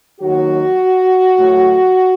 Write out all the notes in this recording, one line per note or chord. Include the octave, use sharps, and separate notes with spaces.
D#2 D#3 F#3 F#4
A2 F#3